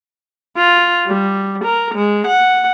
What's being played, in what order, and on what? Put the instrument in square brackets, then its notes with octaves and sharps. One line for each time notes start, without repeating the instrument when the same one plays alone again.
[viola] F4
G3
A#4
G#3
F#5